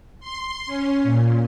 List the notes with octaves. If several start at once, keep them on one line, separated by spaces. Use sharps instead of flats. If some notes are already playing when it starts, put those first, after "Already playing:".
C6
C#4
A#2